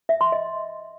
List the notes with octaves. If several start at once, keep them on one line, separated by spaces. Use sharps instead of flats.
E5
C6
D#5